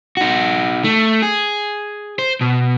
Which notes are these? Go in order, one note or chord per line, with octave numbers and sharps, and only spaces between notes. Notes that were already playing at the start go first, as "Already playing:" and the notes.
D#4 F#4
A3
G#4
C5
B2